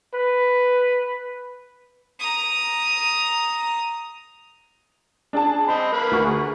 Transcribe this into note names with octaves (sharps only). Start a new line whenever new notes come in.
B4
A#5 D#6
D4 G#4 A5
C4 D#5 B5
A#3 B4
D2 A#4 C#6
G#4